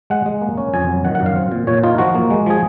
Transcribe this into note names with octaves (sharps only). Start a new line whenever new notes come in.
G#3 F#5
G#3
A#3
C#4
F2 G#5
F#3
D#3 F#5
F#5
F#2
F5
C4
A#2
A#2 C#5
D#4 F4
F3 F#4
A#3
G#3
F3 G#4